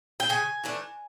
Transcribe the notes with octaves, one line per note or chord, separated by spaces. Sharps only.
G5
C#3 G#5
E3 A3 D4